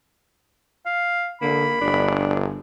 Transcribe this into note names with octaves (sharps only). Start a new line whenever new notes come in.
F5
D3 A#3 B5
G1 D4